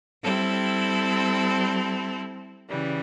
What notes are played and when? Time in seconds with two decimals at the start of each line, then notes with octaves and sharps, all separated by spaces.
0.22 G3 C4 E4 A4
2.69 C#3 E3 G3